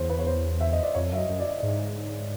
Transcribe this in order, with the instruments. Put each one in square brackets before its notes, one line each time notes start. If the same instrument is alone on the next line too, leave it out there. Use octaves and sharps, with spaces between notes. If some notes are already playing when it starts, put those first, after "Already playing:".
Already playing: [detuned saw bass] E2 [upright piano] C5 C#5
[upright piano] B4
C#5
C5
E5
D#5
D5
[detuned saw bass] F2 [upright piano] C#5
[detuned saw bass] F#2 [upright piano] E5
[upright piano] D#5
[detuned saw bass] F#2
[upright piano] D5
D#5
[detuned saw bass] G#2 [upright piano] D5